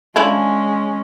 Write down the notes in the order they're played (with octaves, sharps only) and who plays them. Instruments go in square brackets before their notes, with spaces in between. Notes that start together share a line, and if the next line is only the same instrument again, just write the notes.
[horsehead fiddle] G#3 C#4 [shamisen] D4 E4 F4